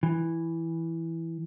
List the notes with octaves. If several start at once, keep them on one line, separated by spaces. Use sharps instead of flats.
E3